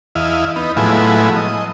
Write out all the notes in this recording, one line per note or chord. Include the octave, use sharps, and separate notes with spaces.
E2 E4 D#5 F5
B3 D#4
A2 F3 F#3 G#3 B3 E4
D#5